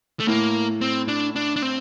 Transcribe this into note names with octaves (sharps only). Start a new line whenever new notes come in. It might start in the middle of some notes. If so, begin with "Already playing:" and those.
A3
A2 A#3
C4
D4
D4
D4
C4